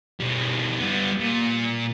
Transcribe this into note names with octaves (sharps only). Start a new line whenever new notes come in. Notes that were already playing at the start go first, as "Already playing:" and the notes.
B2 G3
G3 B3
A#2